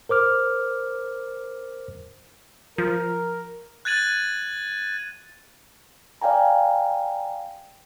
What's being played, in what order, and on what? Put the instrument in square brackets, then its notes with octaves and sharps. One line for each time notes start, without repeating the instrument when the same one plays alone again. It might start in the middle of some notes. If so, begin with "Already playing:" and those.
[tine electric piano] A#4 C5 D6 F6
[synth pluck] F3 [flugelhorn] A#4
[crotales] F#6 G#6 A6 D#7 F#7
[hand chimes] D5 F5 G5 G#5 A#5